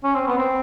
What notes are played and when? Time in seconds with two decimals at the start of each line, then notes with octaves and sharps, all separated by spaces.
0.03 C#4
0.15 C4
0.27 B3
0.38 C4